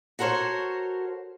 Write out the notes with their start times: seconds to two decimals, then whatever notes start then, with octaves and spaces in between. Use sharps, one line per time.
0.19 F#4 A4 A#4 C5 C#5